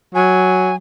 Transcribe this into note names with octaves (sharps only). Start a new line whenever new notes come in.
F#3 G#5